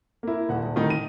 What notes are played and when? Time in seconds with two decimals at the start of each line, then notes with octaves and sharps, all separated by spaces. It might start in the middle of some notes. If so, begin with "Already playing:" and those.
0.23 A#3 E4
0.49 D#1 F#5
0.62 D#1
0.76 A2 D#3 G3 D#4
0.90 D#7